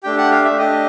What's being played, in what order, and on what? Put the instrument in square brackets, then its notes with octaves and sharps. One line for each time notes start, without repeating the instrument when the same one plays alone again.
[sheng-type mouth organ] A3 D4 G4 G5
F#5
F5
E5
A3 D4 G4 D#5